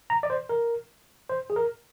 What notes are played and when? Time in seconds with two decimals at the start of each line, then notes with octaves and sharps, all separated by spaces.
0.10 A#5
0.23 D5
0.30 C5
0.49 A#4
1.29 C5
1.50 G#4
1.56 A#4